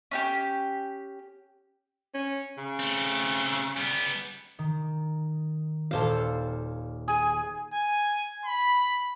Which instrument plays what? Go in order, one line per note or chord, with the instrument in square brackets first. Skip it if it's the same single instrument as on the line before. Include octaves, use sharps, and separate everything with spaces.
[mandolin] C#4 D#4 G4
[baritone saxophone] C#4
C#3
[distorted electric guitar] A3 C4
G3 B3
[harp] D#3
[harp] D#1 F6 [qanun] A4 C5 F5
[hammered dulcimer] G#4 [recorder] G#5
[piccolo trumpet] G#5
B5